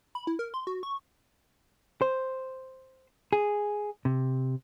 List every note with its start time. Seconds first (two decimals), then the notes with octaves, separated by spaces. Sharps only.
0.15 B5
0.27 E4
0.39 A#4
0.54 C6
0.67 F#4
0.83 C#6
2.02 C5
3.33 G#4
4.05 C3